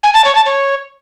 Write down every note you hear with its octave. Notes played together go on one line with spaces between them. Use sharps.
G#5
A5
C#5
A5
C#5